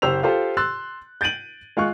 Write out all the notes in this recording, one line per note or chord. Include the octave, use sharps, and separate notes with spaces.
F#1 G4 C5 E6 F7
F4 G4 A4 C5
C6 E6 F#6 A6
G6 A6 D7 D#7 F#7
G#3 F4 F5 C#6 F#6